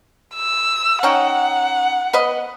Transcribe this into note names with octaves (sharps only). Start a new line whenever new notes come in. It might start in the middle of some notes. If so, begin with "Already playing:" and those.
E6
C#4 D#4 F#5 G5
B3 B4 D#5